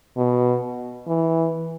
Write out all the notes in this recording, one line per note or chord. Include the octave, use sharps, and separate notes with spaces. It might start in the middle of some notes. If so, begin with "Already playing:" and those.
B2
E3